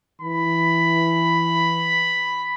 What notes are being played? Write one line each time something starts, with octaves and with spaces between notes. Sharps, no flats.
E3 B5